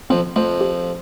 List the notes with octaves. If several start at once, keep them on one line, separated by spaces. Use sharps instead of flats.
F2 F3 C4
F2 F3 A3
G4